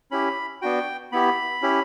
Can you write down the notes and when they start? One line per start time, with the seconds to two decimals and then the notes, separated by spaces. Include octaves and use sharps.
0.11 C#4 E4 G4 B5
0.62 B3 D4 F#4 G5
1.12 B3 E4 G4 B5
1.62 C#4 E4 G4